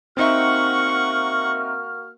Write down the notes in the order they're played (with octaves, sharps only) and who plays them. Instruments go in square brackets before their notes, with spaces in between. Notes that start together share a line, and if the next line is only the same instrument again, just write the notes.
[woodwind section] A#3 F#4 F6 [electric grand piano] C4 D#4 E5 [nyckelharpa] F#5 C#6